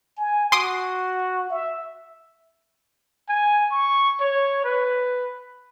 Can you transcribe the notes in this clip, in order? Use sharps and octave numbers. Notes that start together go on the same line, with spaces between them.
G#5
F#4 C6 D6 D#6
E5
G#5
C#6
C#5
B4